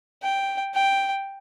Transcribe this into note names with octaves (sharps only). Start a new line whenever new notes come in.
G5
G5